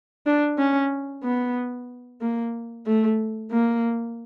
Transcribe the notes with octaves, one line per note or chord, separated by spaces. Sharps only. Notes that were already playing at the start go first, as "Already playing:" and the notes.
D4
C#4
B3
A#3
A3
A#3